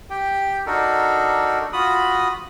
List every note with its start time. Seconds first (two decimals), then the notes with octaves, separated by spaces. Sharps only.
0.10 G4 G5
0.66 D4 D#4 F#4 A4 A#4
1.73 F4 F#4 B5 D#6